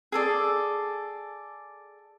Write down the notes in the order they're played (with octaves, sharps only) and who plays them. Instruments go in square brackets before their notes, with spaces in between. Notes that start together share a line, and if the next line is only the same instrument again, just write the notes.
[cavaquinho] G#4 A4 D5